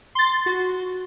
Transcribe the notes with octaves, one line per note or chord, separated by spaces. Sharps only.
C6 A6
F#4